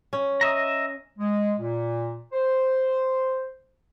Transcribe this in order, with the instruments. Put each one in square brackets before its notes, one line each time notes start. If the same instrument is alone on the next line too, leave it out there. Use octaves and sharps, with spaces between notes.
[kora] C#4
[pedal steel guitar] D#5 E5 A#5
[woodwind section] G#3
A#2
C5